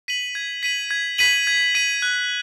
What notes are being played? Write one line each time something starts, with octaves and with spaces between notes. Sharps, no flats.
B6 D#7 F#7
G#6
B6 D#7 F#7
G#6
B6 D#7 F#7
G#6
B6 D#7 F#7
F#6